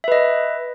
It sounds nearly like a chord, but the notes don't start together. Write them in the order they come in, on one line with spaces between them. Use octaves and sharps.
E5 B4 D#5